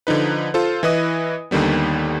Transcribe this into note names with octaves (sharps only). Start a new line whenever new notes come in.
D3 F3 D#4 B4
F4 A4 C5
E3 E4 B4 D#5 D#6
D#2 D3 D#3 G3 B3